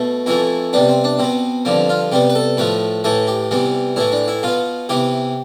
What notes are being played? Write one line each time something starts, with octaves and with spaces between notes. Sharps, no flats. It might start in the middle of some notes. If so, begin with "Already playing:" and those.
Already playing: B2 A3
F2 E3 A3 E4
C3 G3 B3 D4
C4
D4
B2 B3 C4
G2 D3 F3 C4
F4
C3 G3 B3 G4
B4
A4
A2 F3 A3 B4
A2 E3 A3 A4
G4
C3 E3 G3 B3
A2 E3 A3 E4
D4
E4
B2 B3 F4
C3 E3 B3 G4